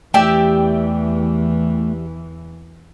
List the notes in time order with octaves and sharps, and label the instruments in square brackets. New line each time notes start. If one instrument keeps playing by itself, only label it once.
[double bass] E2 E3 [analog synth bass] A3 [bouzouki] G4 D5 E5 [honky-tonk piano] G5